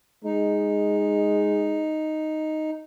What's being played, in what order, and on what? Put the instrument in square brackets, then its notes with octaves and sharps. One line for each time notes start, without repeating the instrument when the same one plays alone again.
[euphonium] G#3 [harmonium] D#4